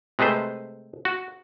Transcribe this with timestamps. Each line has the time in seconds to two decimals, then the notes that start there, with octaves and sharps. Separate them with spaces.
0.19 C3 G#3 A3 B4 C5
1.05 F#4